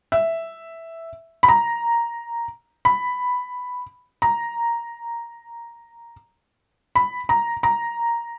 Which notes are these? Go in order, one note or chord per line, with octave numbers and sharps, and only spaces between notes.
E5
B5
A#5
B5
A#5
B5
A#5
A#5